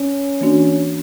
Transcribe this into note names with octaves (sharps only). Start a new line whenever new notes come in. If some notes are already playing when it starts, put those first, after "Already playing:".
Already playing: C#4
E3 A#3 D4 F#4